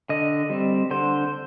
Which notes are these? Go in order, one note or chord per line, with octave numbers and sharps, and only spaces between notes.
D3 D#5
G3 C4
D3 C5